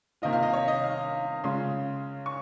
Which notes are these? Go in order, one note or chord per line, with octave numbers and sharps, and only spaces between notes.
C3 D#3 A#3 F4 D#5
F5
D#5
C#5
D#5
F5
C#3 G#3 C#4 F4 C6
C#6